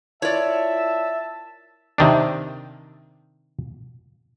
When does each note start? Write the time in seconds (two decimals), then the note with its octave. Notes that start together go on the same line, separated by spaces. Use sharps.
0.22 E4 F4 A#4 C#5 D5 E5 A5
1.98 C3 D#3 D4